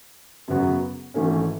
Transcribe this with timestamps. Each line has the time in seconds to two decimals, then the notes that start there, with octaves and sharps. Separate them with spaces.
0.48 F#2 C#3 F#3 B3 F#4
1.14 G#1 G#2 E3 A3 C#4